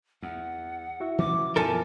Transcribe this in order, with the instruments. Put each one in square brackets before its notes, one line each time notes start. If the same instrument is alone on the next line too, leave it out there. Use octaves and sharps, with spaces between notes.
[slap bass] E2 [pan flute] F#5
[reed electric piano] E4 F#4 E5
[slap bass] E3 F3 C#4 [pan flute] D6
[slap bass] F#2 B2 [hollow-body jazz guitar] F3 A4 A#4 [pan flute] G#5